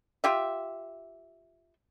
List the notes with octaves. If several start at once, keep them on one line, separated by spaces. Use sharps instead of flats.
F4 G4 E5